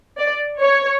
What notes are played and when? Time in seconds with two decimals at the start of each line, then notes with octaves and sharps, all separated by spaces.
0.18 D5
0.61 C#5